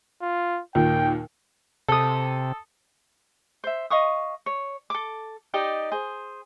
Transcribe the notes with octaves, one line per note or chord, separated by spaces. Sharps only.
F4
D#2 A#2 G5
C3 A4 D#6
C5 E5
D#5 F5 C#6 D#6
C#5
A4 D6
D#4 G4 D5 D#5
G#4 C5